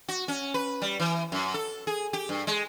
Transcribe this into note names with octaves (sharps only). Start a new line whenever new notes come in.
F#4
C#4
B4
G3
E3
F#2
A4
G#4
G4
G2
G#3